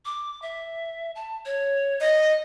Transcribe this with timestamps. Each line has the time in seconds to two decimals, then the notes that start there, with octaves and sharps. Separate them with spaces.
0.05 D6
0.42 E5
1.15 A5
1.46 C#5
2.01 D#5